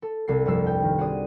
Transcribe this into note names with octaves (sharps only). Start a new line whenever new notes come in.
A4
C2 A4 C7
G1 F2 G3 E6 C7
G5
D#3
F#4 G#4 C5 D5 D#6